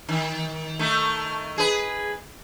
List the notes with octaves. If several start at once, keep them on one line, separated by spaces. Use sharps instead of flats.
D#3
D#3 A3
G#4 B4